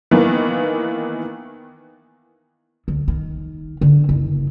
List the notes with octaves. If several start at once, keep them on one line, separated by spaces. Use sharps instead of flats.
D#3 E3 A#3 B3
D2
D#3
D3
F#1